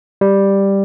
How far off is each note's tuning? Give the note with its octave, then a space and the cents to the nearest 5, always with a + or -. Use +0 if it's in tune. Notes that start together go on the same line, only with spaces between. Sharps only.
G3 +5